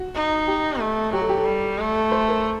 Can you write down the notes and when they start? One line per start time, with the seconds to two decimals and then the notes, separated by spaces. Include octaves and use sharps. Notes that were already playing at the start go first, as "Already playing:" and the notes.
Already playing: F#4
0.15 D#4
0.47 G4
0.80 A3
1.13 F#3 G4
1.21 A4
1.29 G4
1.37 A4
1.45 G3
1.79 A3
2.11 C5
2.28 A#4